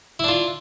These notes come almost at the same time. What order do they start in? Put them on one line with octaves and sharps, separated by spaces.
E4 D4 F4